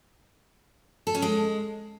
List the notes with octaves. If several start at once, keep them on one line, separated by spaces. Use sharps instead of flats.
A4
C#4
G#3